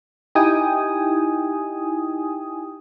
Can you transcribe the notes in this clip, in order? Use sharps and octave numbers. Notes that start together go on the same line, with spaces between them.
D#4 E4 G4 G5 G#5 D#6